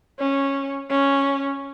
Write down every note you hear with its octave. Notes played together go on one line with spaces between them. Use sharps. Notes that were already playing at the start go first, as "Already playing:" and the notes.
C#4
C#4